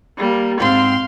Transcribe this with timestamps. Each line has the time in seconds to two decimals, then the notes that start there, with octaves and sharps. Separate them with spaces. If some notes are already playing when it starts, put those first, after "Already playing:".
0.18 G3 A#3
0.60 G#2 C4 F5 C6